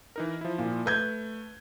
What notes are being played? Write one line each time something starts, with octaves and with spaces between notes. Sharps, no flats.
E3 D#4 A#4
F3 E4
A#2
A3 B4 G6 G#6